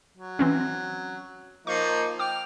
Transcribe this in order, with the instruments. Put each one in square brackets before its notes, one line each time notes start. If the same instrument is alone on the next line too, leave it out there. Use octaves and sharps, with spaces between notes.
[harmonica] F#3
[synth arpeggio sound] E3 C4 C#4
[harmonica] F3 A#3 D#4 [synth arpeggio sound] C#6
[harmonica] G5 F6 [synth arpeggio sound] D6